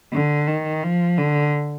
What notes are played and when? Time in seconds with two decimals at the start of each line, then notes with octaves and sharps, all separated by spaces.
0.13 D3
0.48 D#3
0.84 F3
1.18 D3